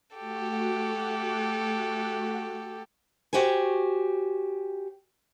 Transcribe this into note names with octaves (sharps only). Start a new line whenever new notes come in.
A3 F#4 G4 A4 F#5
F#4 G4 C5 G#5